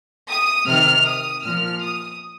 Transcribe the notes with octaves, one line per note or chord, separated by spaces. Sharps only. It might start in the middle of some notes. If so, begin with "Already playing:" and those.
D#6
C3 D#3 F6
D#6
A#2 F3 F6
D#6